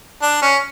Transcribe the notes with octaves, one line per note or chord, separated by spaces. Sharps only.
D4
C#4